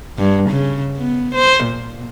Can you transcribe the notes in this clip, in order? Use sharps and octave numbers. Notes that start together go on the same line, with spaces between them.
G2
C#3
B3
C5
A#2